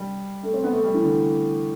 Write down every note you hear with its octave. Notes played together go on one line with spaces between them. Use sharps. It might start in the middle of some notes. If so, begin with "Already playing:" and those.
Already playing: G3
A3
C4
B3
A3
G3
E3
D3